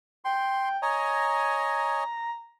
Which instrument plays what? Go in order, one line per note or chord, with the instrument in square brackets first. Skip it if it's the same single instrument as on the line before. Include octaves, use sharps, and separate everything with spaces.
[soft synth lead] G5 [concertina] C6
[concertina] C#5 D#5 G#5 [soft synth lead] A#5